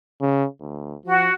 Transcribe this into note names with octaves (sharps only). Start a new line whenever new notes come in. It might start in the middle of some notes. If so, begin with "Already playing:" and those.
C#3
D2
F3 F#4